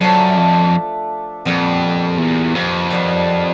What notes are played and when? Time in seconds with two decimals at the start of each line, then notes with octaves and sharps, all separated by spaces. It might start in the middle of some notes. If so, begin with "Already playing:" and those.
0.01 F#2 F3 A3 D4
0.37 F2
1.45 F2 A#2 G3 B3
2.18 E2
2.55 F2
2.91 D#3 G3 B3 D4